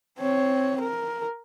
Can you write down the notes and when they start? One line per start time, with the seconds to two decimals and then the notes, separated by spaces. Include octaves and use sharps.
0.19 C4 C#5
0.80 A#4